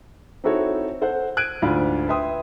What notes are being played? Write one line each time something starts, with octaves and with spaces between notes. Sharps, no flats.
C4 D#4 E4 F#4 A4 C#5
A4 C5 F#5
F#6 G#6 D7 D#7
D2 G#2 D4 F4 B5
B4 E5 G5 C6 D#6